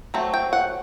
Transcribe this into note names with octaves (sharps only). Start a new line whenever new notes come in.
F#3 A3 C4
G5
F#5